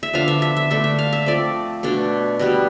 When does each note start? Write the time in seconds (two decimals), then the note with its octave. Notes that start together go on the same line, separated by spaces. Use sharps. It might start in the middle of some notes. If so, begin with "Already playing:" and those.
0.03 E5
0.13 D3 F3 B3 D4 F5
0.28 E5
0.42 E5
0.57 E5
0.70 D3 A3 D4 E5
0.84 E5
0.99 F5
1.13 E5
1.26 F3 A3 C4 D5
1.83 B2 A3 D4
2.39 B2 G3 B3